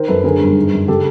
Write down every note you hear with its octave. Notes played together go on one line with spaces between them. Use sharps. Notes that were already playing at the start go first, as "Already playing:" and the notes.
Already playing: D#3 A#4 C5
F#2 A4 B4
D3 G#4 A#4
G2
D#3
F#2
C#3 G4 A4